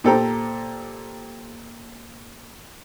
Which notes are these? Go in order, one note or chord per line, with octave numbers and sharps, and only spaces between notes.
A#2 G4 A4 C5 G5 A#5